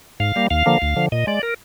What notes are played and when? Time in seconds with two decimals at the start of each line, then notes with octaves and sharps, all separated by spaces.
0.20 G#2 F5
0.36 G3 A#3
0.50 D#2 F5
0.66 D3 F3 A#3
0.82 D2
0.96 D3 F3
1.12 A#2 D#5
1.27 G#3 D5
1.43 A#4